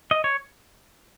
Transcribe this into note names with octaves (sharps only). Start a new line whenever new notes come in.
D#5
C#5